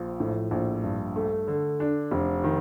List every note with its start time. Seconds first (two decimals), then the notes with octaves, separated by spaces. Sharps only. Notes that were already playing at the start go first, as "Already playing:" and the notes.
Already playing: A#1 F3
0.20 A2
0.51 A#1
0.84 G2
1.16 A3
1.48 D3
1.80 D4
2.11 F1
2.44 D#3